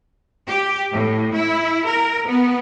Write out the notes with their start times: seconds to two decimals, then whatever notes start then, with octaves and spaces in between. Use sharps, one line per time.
0.48 G4
0.91 A2
1.34 E4
1.85 A#4
2.26 B3